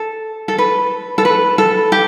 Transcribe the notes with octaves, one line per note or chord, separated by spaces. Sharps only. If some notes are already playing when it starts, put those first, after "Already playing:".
Already playing: A4
A4
B4
A4
B4
A4
G4